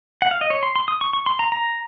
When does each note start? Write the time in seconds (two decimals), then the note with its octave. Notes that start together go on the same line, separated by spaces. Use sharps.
0.22 F#5
0.31 F5
0.41 D#5
0.50 C#5
0.63 C6
0.76 C6
0.88 D#6
1.01 C#6
1.13 C#6
1.26 C6
1.39 A#5
1.52 A#5